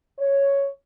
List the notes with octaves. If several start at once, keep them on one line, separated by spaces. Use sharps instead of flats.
C#5